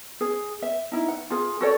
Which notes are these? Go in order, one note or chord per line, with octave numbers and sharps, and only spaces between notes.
G#4
E5
D#4 E4
F#5
F4 G#4
F#4 A4 C#5 D5